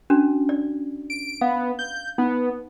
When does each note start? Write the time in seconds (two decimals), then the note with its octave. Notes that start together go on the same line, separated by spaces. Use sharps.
0.10 C#4 D4 F#4
0.49 D5
1.10 D7
1.41 B3 F5
1.79 G6
2.18 B3 D#4